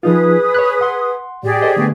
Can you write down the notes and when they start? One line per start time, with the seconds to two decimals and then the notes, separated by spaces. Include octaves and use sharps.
0.03 F3 D#4 F4 G#4 B4 D#6
0.54 C#5 B5 F#6
0.81 F#5 C6
1.43 A2 G4 G#4 D5
1.62 A4 C5 D#5
1.77 D3 A3 B3